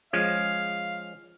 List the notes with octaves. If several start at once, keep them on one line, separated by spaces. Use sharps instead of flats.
F3 G#3 C#4 F5